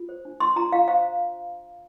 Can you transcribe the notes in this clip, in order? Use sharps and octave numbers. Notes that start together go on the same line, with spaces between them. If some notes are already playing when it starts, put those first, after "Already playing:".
Already playing: F4
C5
D4
D4 C6
F4 A#5
F4 F5
C5 F5